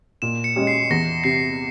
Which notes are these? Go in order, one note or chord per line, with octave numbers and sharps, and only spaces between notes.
A#2 E7
C#7
G#3 C#4 G4
C7
E2 A#6
C3 C7